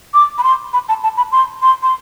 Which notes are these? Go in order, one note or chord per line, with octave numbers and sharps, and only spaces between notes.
D6
B5
C6
B5
A5
A5
B5
C6
C6
C6